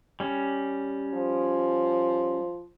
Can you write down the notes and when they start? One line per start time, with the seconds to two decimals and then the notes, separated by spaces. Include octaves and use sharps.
0.20 G3 C#4
1.14 F3